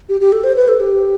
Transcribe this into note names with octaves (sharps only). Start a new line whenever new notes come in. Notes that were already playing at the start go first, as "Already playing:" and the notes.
G4
G4
A4
C5
B4
A4
G4